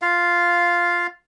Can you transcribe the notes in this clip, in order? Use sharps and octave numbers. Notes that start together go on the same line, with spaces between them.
F4 F5